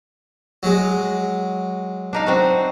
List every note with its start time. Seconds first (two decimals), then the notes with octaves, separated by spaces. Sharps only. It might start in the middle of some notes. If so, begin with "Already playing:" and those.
0.63 F#3 G#3
2.13 D4 D#4 F5
2.26 C4 F#4